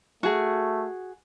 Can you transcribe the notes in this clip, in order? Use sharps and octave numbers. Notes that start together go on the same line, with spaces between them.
A3 F#4 G#4